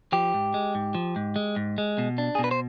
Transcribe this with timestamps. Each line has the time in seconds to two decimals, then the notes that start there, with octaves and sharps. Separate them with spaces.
0.12 F3 G4
0.34 G#2
0.54 G#3
0.75 G#2
0.95 F3
1.16 G#2
1.36 G#3
1.56 G#2
1.78 G#3
1.98 B2
2.18 D4
2.35 G#4
2.39 B2
2.44 B4
2.51 C5